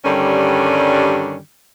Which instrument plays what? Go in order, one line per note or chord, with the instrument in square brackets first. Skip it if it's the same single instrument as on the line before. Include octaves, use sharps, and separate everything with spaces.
[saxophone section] G2 D3 D#3 G3 C#4